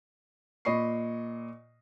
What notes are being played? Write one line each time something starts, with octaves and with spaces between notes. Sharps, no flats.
A#2 D#5 B5 C#6 C7